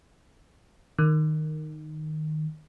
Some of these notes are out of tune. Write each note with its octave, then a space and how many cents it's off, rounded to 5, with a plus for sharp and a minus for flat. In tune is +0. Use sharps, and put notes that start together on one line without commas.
D#3 -10